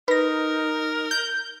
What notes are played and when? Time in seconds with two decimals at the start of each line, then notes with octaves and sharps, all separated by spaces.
0.08 D#4 A#4 B4 A#6
1.11 G6